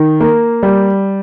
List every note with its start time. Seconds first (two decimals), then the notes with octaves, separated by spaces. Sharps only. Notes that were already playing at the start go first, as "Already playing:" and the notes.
Already playing: D#3
0.20 A#3
0.63 G3